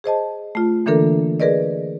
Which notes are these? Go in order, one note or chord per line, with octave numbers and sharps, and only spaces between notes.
G#4 C5 D#5 A5
A3 F4
D3 E3 A#3 D4 A4 A#4
G#4 A#4 B4 D5 D#5